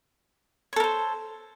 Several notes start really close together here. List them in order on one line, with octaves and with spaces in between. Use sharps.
C#5 A4 A#4 C5